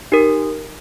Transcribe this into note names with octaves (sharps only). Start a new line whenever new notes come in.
D#4 G4 A#4